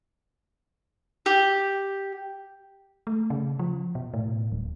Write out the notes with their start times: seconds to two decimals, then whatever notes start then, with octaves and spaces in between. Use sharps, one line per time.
1.26 G4
3.07 A3
3.30 C#3
3.59 F3
3.95 B2
4.14 A2
4.52 D1